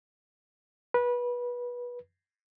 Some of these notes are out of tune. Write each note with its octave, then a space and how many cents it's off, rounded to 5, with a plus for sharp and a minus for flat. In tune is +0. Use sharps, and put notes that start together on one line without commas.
B4 -25